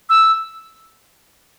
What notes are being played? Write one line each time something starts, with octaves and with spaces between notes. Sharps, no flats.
E6